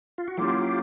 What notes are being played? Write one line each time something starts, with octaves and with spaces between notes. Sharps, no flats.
F4
F#4
F#3 A#3 C#4 E4 F4 G4